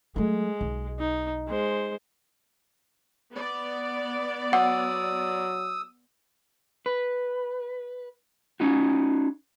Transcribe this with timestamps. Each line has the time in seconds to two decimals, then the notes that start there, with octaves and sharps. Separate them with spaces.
0.16 F#3 G#3 A3
0.61 B1
0.99 D#4
1.47 G#3 C5
3.34 B3 D5
4.53 F#3 F#5 D#6 E6
6.86 B4
8.60 C#4 D#4 F#4